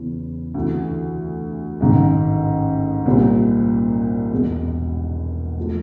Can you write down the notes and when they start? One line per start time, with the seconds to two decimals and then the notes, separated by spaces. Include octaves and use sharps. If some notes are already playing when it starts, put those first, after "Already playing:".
Already playing: E2 C#3 E3
0.54 D2 C3 E3
1.81 A1 G#2 D#3 G#3
3.06 C2 A#2 G3 C4
4.31 E1 E2 B2 G#3
5.60 F3 A3